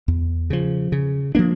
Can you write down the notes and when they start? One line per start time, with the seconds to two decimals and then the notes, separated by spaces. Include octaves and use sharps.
0.08 E2
0.50 C#3 F3
0.92 C#3
1.35 F3 A#3 D4